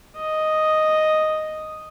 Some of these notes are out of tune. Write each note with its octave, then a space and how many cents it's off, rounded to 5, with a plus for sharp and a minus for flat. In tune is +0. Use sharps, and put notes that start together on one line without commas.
D#5 +0